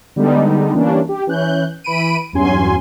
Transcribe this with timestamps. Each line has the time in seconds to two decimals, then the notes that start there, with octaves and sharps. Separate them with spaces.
0.16 D3 G3 G#3 B3 D#4
0.74 E3 G3 A#3 C#4 D4
1.09 G4
1.27 E3 C#4 F#6 G6
1.84 E3 B5 D7 D#7
2.33 E2 G2 F#3 C#4 G#5 C6